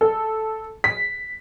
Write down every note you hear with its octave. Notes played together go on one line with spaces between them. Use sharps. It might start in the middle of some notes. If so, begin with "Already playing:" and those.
A4
B6